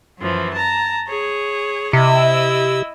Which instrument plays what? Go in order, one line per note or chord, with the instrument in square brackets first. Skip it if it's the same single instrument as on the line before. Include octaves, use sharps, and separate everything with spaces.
[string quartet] F#2 E3 F3
A5 A#5
G#4 C#5
[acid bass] C3 [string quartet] E4 D#5 E6